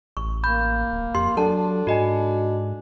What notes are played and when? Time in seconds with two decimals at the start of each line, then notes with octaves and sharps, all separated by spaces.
0.17 A1 C#6
0.44 A#3 B5 G6
0.92 D1
1.15 F2 G4 C6
1.37 F#3 D4 A4 F#5 A5
1.87 G#2 F#4 D#5 G#5